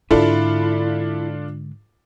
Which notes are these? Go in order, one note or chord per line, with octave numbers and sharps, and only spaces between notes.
G#2 D3 D4 E4 F4 A4